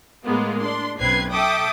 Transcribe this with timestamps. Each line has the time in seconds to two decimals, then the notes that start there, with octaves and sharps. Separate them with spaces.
0.25 A2 G#3 A#3 B3 F4
0.61 D4 C6
0.99 B1 F#2 C4 B4 G#6 C7
1.32 A4 E5 G5 D6 D#6